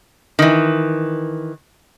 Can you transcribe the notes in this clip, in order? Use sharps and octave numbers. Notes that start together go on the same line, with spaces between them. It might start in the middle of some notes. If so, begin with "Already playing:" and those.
D#3 E3